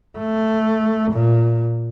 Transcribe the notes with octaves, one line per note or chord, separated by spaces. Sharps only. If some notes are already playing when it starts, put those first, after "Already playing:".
A3
A#2